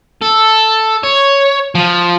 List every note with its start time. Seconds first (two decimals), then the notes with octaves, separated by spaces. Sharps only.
0.22 A4
1.04 C#5
1.75 F3